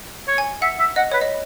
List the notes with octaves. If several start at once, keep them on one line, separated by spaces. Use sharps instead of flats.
C#5
G#5
E5 F#5
E5
D#5 F#5
B4 C#5
D#5